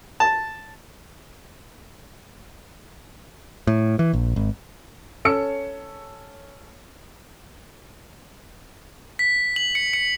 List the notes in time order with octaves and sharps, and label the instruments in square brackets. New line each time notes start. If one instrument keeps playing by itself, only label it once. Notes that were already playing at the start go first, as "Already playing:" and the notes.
[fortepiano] A5
[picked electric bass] A2
E3
A#1
G#1
[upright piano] C#4 A4 C#5 E6 C#7
[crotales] B6
F#7
C#7
C#7